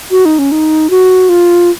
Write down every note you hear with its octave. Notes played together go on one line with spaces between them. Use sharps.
F#4
D#4
C#4
D#4
F#4
F4